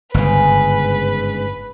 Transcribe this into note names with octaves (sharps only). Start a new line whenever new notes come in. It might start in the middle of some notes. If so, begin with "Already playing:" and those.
G1 G#2 C#3 B4